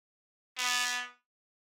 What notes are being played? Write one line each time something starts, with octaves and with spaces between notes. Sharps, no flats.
B3